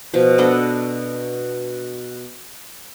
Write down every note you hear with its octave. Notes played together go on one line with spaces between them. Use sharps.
B2 F3
B3 D4 A4 D#5